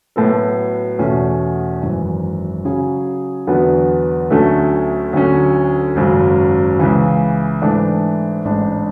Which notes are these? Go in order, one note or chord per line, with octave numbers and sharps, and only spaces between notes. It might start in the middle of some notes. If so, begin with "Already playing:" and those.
A2 F#3 B3 F#4 A4
E2 B2 A3 C#4
G#1 F#2 E3
C#3 F#3 C#4 G#4
E2 D3 F#3 B3 F#4
D2 D3 F#3 A3 C#4
D2 D3 F#3 C#4
G#1 F#2 C#3 F#3
C#2 C#3 E3
G#2 E3 A3 D4
A1 G#2 G#3 D4